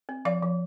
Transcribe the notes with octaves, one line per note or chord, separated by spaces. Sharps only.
C4
F3 D5 F5
F3